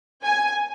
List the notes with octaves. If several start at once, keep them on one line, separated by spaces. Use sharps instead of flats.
G#5